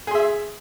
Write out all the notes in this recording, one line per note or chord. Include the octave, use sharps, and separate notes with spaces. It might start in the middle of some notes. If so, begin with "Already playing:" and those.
G#4 E5 C6